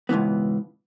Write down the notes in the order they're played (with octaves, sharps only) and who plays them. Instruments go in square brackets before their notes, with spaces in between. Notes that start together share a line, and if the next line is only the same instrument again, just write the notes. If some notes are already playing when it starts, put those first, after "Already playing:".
[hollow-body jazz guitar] C#2 G#2 B2 E3 B3